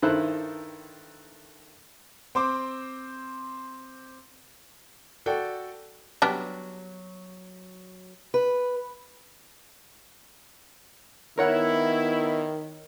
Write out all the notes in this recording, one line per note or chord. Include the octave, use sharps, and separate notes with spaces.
G2 D#3 E4 A4 C5 F#6
C4 C5 D6
F#4 A4 D5 G5
F#3 G3 B3 D4
B4
D#3 B3 E4 A#4 C#5 F#5